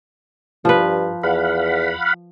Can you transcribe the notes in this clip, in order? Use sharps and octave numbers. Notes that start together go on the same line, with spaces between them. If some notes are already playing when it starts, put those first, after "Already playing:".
G2 F3 B4
E2 F5 F#5 B5